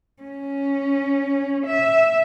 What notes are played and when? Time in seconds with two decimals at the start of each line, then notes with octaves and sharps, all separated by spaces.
0.23 C#4
1.67 E5